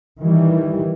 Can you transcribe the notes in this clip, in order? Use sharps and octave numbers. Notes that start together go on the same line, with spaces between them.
D#3 E3 G3